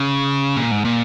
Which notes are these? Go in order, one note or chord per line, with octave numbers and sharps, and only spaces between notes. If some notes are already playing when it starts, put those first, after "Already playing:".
Already playing: C#3
A#2
G#2
A#2